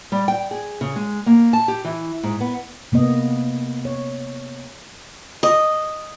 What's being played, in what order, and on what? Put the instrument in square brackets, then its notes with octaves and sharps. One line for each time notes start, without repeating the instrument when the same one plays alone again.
[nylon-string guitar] G3
G5
G#4
C#3
G#3
A#3
A5
G4
E3
G#2
B3
[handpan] C3 A#3 B3 D#5
C#5
[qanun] D#5